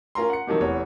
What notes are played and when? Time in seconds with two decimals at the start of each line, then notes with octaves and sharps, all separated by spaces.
0.15 C#4 F4 A#4 A#5 C6
0.30 F#5 C#7
0.47 C3 D#3 F3 F#3
0.60 F1 E2 C#5